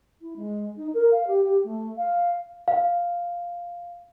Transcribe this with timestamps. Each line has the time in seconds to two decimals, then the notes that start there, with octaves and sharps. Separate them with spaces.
0.21 E4
0.36 G#3
0.77 D#4
0.94 A#4
1.11 F5
1.27 G4
1.44 G4
1.64 A3
1.97 F5
2.68 F5